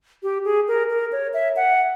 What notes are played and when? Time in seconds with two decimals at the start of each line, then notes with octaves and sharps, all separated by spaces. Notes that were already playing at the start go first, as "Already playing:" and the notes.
0.23 G4
0.45 G#4
0.68 A#4
0.90 A#4
1.12 C#5
1.34 E5
1.56 F#5